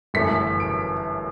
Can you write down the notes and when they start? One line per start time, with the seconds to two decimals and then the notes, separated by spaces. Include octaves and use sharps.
0.14 G1 F#2 E3 A3 B6
0.60 D7